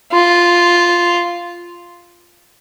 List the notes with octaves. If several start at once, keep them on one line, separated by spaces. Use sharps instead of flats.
F4